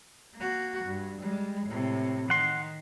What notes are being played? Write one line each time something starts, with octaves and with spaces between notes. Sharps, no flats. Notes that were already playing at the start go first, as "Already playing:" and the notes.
A#3 F#4
G2
G3 G#3
A2 C3
D#3 F#5 C6